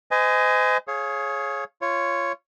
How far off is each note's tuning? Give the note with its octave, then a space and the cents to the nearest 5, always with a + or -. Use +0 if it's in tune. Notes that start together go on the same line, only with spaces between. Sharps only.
C5 -40 D#5 +10 G#5 +0
G#4 +20 C#5 -15 F5 +0
F4 -20 C#5 +0